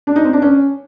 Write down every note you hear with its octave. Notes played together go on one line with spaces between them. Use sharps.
D4
D#4
C4
D4
C#4